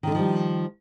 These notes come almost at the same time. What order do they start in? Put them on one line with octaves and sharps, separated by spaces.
D#3 D3 D#4 F3 G3